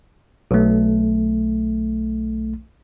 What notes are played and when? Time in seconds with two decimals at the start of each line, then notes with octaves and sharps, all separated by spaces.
0.51 B1 A3